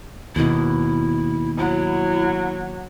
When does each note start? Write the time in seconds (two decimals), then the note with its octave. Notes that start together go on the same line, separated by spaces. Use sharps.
0.36 D#2 B2 E4
1.58 F#3 E4